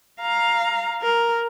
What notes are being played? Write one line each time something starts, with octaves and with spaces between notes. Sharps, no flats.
F5 A#5
A#4